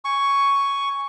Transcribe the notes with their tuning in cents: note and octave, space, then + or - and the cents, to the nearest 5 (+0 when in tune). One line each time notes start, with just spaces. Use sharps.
G#5 -5 C#6 +5